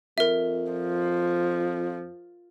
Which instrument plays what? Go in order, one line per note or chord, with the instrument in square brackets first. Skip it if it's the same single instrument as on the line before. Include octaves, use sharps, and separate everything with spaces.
[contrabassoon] F2 [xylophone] A#4 E5
[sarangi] F3